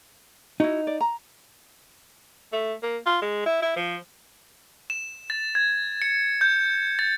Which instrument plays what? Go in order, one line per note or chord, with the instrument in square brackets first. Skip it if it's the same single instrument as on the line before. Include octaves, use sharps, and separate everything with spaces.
[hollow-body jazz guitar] D#4 [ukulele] E4 F#4
[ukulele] D5
A#5
[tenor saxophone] A3
A#3
F4
G#3
E4
E4
F3
[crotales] E7
A6
G#6
C#7
G6
A6